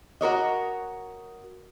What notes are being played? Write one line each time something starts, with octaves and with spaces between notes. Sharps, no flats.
F#4 A#4 C#5 D#5